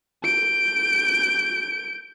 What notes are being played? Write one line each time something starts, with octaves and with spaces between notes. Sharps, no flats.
G6 D7